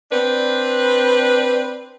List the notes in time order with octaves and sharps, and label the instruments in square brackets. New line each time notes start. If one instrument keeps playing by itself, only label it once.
[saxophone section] C4 D4 B4